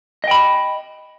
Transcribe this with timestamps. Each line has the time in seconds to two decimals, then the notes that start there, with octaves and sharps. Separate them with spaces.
0.24 D#5
0.27 G5
0.31 B5